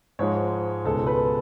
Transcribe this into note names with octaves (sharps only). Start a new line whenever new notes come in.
G#2 F3 G#3 C#5
C#2 B2 G#3 A4
B4